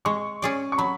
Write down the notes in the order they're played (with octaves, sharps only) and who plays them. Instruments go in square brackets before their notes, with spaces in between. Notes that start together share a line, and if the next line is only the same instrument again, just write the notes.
[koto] G#3 [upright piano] C#6
[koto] C#4 G#4 D5
[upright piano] C#6
[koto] F#3 [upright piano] B5